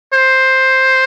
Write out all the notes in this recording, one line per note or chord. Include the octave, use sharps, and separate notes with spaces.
C5